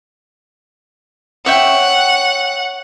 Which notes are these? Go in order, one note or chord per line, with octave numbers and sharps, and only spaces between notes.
C#5 E5 F#5 G5